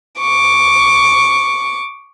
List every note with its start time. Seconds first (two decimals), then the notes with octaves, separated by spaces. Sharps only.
0.20 C#6 D6